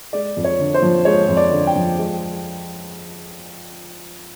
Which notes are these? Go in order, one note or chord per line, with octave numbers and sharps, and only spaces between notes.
G#3 D5
F2
C#5
D3
C5
F3
G#3 C#5
F2
D5
D3
G5
F3
G#3